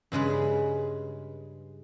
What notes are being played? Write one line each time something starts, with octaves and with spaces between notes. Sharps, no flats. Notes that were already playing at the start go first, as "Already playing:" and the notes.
G2 C#3 G#3 B4